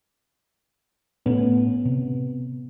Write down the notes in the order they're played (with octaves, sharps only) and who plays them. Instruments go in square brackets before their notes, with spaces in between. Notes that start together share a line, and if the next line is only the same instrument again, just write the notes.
[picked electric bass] A2 A3 C#4 [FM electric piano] B3
[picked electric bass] C3